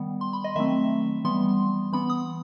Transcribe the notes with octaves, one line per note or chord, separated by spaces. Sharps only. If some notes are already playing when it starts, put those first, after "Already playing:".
Already playing: D#3 G3 B3
C6
B5
D#5
D#3 F#3 A3 C4 E5
E3 G3 B3 C6
E3 B3 B5
D#6